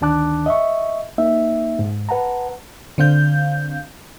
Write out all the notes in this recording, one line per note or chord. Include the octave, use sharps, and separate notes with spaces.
D2 D#3 D4 A5 D6 F#6
D#5 E5 C#6
A#3 D#4 E5
G#2
B4 F#5 A5 A#5
D3 C4 F5 G6